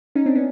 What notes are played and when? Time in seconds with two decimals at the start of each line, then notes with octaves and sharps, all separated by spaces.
0.15 C#4 D#4
0.26 C4 D4
0.35 B3 C#4